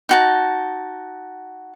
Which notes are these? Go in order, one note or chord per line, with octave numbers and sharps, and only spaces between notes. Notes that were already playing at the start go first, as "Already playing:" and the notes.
D#4 F#4 A5